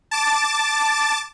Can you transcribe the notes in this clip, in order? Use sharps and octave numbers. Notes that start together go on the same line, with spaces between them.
A5 D6 A6